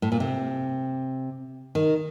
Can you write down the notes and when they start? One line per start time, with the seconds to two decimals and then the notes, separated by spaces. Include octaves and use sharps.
0.02 A2
0.12 A#2
0.20 C3
1.75 D#3